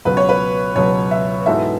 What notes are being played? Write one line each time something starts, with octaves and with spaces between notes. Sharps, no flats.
C#2 B2 F#3 B3 B4
C#5
B4
C#2 B2 F#3 B3 C#5
E5
G#2 E3 B3 F#4 A4 E5